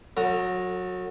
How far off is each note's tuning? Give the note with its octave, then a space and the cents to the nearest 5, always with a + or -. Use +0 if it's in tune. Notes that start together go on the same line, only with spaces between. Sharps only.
F#3 -20 A4 +35 A#5 +0